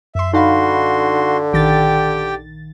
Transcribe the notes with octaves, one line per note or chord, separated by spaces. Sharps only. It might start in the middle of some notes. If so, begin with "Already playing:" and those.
F#2 E5 C6
D3 D#4 F#4 F5 B5 C6
A#1 D#3 G4 G5 A6